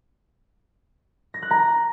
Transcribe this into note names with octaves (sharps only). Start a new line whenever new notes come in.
A#6
F#6
A#5